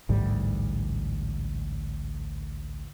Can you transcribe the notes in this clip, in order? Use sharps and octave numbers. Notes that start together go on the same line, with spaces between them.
A1 D2 G#2 G3